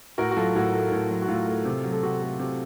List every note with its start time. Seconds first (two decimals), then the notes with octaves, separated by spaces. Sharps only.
0.18 A2 F#4 A#4
0.31 F#4
0.36 F#3 F4 A4
0.55 A2 F#4
0.73 A3
0.91 A2
1.11 F#3
1.22 F#4
1.28 A2 F4
1.47 A3
1.65 C3
1.84 F#3
1.92 A4
2.03 C3 F#4
2.22 A3
2.39 C3